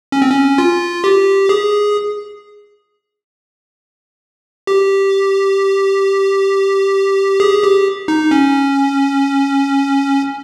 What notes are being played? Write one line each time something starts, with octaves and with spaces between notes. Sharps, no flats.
C#4
C4
C#4
F4
G4
G#4
G4
G#4
G4
D#4
C#4